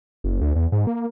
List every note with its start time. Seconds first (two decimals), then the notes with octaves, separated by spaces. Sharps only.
0.24 F#1
0.41 D2
0.56 E2
0.72 G#2
0.87 A#3